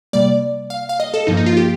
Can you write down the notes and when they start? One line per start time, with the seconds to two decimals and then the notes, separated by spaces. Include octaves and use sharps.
0.13 C3 G3 A#3 D5
0.70 F5
0.89 F5
1.00 D#5
1.14 A4
1.27 G2 F3 A#3 D#4
1.37 D#4
1.46 F4
1.57 G4